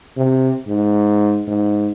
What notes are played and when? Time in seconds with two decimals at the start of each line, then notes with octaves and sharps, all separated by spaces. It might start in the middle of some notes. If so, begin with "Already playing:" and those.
0.17 C3
0.67 G#2
1.48 G#2